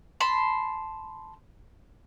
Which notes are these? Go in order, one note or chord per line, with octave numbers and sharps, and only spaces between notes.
A5 B5 C6